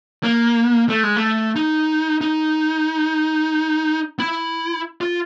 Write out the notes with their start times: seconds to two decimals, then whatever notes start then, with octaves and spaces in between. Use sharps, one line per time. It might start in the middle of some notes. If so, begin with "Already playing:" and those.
0.23 A#3
0.89 A3
1.03 G#3
1.17 A3
1.56 D#4
2.21 D#4
4.19 E4
5.01 F4